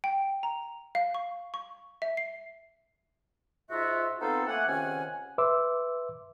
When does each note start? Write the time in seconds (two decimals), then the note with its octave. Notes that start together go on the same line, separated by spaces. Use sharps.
0.04 G5
0.43 A#5
0.95 F5
1.15 C#6
1.54 C#6
2.02 E5
2.17 C7
3.71 G#2 F4 F#4 E5
4.21 F3 B3 C4 D#4 F4 A4
4.48 A3 A#3 F#5 G#5
4.68 C#2 C3 D#3 C#4 F#5 G#5
5.38 B4 E5 C6 D6 E6